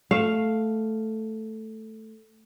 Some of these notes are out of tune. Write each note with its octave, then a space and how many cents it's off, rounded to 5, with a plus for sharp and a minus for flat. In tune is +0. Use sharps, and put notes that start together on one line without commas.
A3 +0 F5 +0